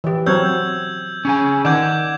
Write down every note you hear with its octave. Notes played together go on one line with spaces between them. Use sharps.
E3 G4
F#3 C4 C#5 E6 G6 G#6
C#4 G#4 G#5
D#3 D5 F#5 D6 G6 G#6